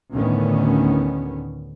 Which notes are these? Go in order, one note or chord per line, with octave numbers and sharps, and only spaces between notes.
D2 A2 D3 D#3 B3 C#4